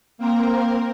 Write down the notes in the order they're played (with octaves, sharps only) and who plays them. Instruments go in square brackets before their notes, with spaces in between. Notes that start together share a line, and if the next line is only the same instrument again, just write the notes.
[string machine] A#3 C4 A#4